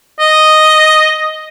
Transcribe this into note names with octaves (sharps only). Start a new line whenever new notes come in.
D#5